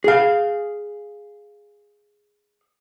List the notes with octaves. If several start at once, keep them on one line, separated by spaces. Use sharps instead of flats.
G#4 F5